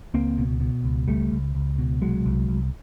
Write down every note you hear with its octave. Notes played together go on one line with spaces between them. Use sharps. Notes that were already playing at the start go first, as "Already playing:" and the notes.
C#2 A#3 C4
B2
B2
C#2
C#2 G3 A3
C#2
C#2
B2
C2 F#3 G#3
C2
C2